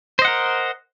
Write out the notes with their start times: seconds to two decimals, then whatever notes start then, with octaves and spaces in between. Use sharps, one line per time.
0.19 C5
0.22 D#5
0.25 F#5
0.28 A#4